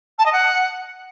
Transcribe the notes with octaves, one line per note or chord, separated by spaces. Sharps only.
A5
D#5
F#5